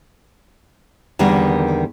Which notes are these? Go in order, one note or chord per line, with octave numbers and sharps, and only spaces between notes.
E2 D3 D#3 G3 A#3